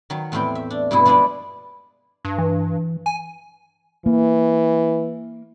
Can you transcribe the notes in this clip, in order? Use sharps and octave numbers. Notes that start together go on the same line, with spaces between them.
D#3 F#3
E2 A2 A3 C4 G5
E5
D4
G2 B2 G#3 E4
F3 G#3 D4 E4 B4 D5
G2
E3
G#5
E3 A#3